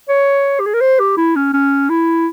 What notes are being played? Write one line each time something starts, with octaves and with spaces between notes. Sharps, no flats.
C#5
G4
G#4
A#4
C5
G4
E4
C#4
C#4
E4